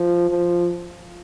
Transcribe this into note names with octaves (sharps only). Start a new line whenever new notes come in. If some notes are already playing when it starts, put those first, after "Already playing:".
Already playing: F3
F3